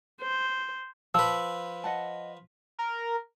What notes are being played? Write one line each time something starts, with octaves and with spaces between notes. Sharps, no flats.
C5
F3 B4 A5 E6
D#5 F#5 A5
A#4